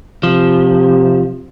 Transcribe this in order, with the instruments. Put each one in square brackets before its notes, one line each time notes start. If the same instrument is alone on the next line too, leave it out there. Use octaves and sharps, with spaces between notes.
[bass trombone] C3 [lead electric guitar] F3